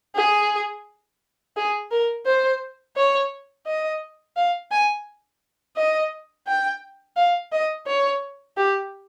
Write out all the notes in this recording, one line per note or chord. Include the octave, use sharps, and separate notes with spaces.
G#4
G#4
A#4
C5
C#5
D#5
F5
G#5
D#5
G5
F5
D#5
C#5
G4